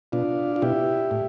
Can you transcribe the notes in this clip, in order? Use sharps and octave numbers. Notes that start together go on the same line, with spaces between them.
B2 D4 F4
F4
B2 E4 G4
A2